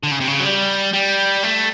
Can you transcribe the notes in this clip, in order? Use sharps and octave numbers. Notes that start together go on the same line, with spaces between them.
D3
C#3
C3
C#3
F#3
G3
G3
A3